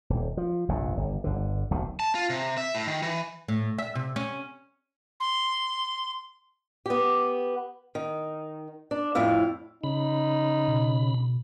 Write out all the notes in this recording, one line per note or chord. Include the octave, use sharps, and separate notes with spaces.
D#1
F3
F1 A#1 G2 C3
G1
G1 D3
D1 B1 C3 D#3
A5
F4
C3
E5
A2
D#3
E3
A2
E5
C3
C#4
C6
B3 G4
D#3
D4
F2 A2 E4 F5
C#3 D#4 B5
B2